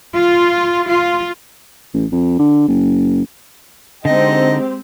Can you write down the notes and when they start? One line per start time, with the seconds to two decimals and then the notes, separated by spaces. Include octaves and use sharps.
0.14 F4
0.88 F4
1.94 A1
2.12 F2
2.39 D3
2.68 F#1
4.05 D3 G#3 C4 D#4 G4 D#5